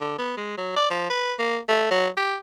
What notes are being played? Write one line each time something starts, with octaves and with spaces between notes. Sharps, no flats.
D3
B3
G#3
F#3
D5
F3
B4
A#3
A3
F#3
G4